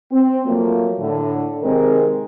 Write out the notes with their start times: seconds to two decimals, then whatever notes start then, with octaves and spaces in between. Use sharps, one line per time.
0.12 C4
0.45 F3 F#3 A3 A#3
1.00 A2 D3
1.63 C3 D#3 G#3 C4 A#4